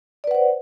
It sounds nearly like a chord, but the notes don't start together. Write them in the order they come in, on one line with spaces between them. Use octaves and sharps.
D5 B4 F#5 C5